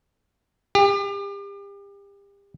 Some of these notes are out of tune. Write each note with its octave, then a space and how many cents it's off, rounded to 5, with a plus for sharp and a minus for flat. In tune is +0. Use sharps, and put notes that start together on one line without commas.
G4 +35